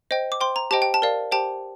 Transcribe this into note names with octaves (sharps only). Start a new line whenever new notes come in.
C5 D#5 G5
D6
C5 G5 C6
A#5
G4 C5 D#5 G5 A5
G5
A5
A#4 D5 F5
G4 C5 G5 A5